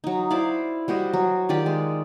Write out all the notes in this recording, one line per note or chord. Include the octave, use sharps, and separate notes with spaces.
F#3 D#4
E4 C5 D5 F5
G3 F#4 C5 D#5
F#3
D#3 F4 G4 D5
G#3